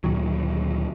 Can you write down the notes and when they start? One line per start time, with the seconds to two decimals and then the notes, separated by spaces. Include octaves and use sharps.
0.04 D2 A#2 D#3 F#3